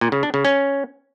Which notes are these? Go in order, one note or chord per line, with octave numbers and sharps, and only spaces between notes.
A#2
C#3
D4
C#3
C#4